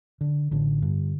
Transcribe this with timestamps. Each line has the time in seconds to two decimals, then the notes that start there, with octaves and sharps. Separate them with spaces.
0.21 D3
0.51 A1 D3
0.82 G2